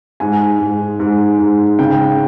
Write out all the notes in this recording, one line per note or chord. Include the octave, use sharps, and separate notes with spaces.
G#2 G#5
G#2
G#2
G#2
C#3 G5